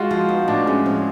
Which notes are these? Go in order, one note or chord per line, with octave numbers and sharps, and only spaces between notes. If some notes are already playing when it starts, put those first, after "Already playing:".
Already playing: G#3 F4 F#4
F3 F4
B3 D#4
A2 D4
G#3 C#4
F3 C4